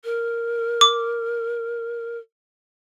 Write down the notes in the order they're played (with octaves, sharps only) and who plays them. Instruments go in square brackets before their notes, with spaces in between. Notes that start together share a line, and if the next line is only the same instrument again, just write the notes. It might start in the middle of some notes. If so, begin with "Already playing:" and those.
[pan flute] A#4
[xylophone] D6